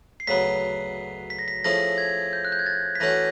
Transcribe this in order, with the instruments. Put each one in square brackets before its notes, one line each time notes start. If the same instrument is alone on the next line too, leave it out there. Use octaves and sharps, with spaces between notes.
[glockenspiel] C7
[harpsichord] D2 C#3 F#3 B3 [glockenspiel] B6
[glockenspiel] B6
A#6
B6
[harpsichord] F3 A3 C#4 E4 G#4 [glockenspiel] A#6
[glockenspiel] G#6
G6
F#6
G6
G#6
A6
B6
[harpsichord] E3 A3 C#4 F#4 [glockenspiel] A#6